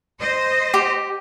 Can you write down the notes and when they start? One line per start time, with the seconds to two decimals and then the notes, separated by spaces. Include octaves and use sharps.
0.19 C5 D#5
0.74 G4